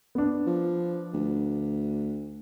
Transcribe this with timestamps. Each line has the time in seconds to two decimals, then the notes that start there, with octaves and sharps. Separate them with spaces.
0.15 B3 D4
0.46 F3
1.14 D2